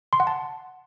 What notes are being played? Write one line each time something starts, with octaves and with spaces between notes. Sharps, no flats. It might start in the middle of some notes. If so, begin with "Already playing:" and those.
C6
F#5
A5